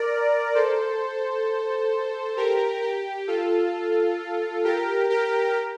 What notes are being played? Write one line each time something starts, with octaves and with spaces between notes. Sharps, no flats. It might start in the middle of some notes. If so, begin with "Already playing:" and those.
Already playing: A#4 D5
A4 C5
G4 A#4
G4
F4 A4
G4 A#4
G4 A#4